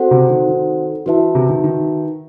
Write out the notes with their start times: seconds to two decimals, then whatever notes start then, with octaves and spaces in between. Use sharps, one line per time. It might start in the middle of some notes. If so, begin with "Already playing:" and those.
Already playing: C4 F#4 A4 C5 F#5
0.11 C3
0.30 D#3
0.49 D#3
1.06 E3 F#4 B4 E5 A5
1.35 C3
1.49 D#3
1.64 D#3